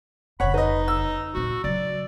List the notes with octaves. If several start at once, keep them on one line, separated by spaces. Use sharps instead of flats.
F1 C#3 C#5 F#5 B5
D#4 B4 D#5
E6
D#1 C4 F#4
C#3 F#3 D5